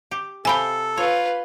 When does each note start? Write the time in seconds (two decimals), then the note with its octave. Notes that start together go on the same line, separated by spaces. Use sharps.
0.11 G4
0.45 C3 A4 F5 G5 G#5 B5
0.97 F4 B4 C#5